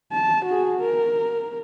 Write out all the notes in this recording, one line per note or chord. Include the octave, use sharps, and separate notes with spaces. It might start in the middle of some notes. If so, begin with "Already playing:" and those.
A5
F#4 G#4
A#4